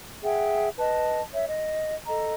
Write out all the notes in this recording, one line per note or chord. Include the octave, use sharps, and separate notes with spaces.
G#4 E5 F#5 G5
B4 D#5 A5
C#5 E5
D#5
A4 D#5 A#5